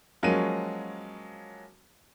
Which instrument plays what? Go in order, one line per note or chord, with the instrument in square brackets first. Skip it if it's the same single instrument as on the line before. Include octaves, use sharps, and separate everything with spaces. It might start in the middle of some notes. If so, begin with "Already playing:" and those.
[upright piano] F3 F#3 G#3 A#3 C#4 D#7